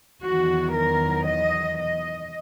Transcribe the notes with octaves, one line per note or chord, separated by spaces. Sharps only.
E2 D#3 F#3 F#4
A#4
D#5
D#5